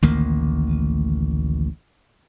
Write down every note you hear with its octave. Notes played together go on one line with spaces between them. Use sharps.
A1 D2 D#3 A#3